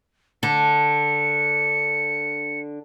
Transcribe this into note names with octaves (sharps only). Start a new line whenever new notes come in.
D3 C#7